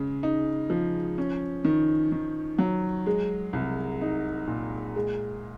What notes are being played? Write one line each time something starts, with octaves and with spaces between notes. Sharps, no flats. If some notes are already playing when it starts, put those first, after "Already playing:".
Already playing: C#3 G#3
D#4
F3
C#4
D#3
D#3
F#3
G#3
C2
D#4
A#2
G#3